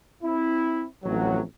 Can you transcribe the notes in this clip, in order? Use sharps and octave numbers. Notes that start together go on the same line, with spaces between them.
C4 E4
A1 F2 A2 F#3